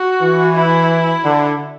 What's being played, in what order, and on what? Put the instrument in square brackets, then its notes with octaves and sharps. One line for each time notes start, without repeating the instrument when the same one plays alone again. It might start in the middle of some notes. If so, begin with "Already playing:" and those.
Already playing: [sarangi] F#4
[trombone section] E3
[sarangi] E4
[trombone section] D3